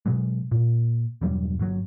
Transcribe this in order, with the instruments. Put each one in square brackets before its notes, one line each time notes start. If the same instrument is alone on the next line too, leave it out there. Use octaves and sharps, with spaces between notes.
[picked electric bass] B2 F#3 G#3
A#2
E1 G2 F#3 G3
G1 F#3